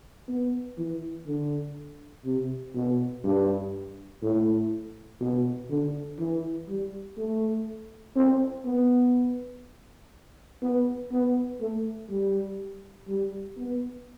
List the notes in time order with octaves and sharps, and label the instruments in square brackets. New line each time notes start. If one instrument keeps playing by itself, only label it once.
[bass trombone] B3
E3
D3
C3
B2
G2
A2
B2
D3
E3
G3
A3
C4
B3
B3
B3
A3
G3
G3
B3